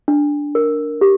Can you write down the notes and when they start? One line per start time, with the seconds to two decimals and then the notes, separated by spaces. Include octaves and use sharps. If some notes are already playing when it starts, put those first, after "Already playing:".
0.08 D4
0.55 A#4
1.01 G4